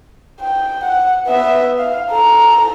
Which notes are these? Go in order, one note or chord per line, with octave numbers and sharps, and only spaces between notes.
G5
F#5
B3 E5
F5
A4 A#5